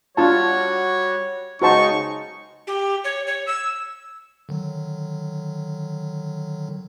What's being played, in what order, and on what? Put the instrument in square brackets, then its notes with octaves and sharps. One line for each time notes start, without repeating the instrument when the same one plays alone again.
[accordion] G3 F#4 [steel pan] D4 F4 A5 [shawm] C#5
[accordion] C#3 G#3 D#4 [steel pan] F#4 C5 A5 [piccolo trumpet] C#6
[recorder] G4
C#5
C#5
E6
[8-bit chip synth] D3 D#3 F#3